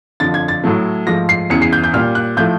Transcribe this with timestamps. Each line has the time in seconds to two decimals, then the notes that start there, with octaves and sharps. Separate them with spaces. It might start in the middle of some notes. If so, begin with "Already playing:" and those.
0.20 F2 D3 F3 A6
0.34 G#6
0.48 A6
0.64 A2 F#3 A3
1.07 G#2 F3 A3 A#6
1.29 C7
1.50 E2 C#3 E3 C#7
1.62 C7
1.73 G6
1.84 G6
1.94 A#2 G3 F6
2.15 F#6
2.37 A2 F3 A3 G6